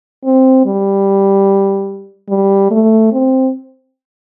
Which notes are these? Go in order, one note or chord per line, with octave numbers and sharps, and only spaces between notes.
C4
G3
G3
A3
C4